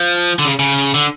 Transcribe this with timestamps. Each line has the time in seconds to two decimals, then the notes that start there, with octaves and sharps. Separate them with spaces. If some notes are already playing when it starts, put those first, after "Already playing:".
Already playing: F3
0.39 D3
0.45 C#3
0.59 C#3
0.94 D3